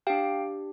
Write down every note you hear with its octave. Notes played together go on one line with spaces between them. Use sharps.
D4 G4 F5 G5